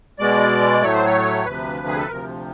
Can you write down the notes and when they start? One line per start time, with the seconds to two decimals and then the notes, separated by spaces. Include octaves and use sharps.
0.19 B2 G#3 D5
0.82 A2 F#3 A3 C#5
0.94 C5
1.05 C#5
1.45 D2 C3 F3 B4
1.87 G#4
1.98 A4
2.08 D2 C3 F3 A#4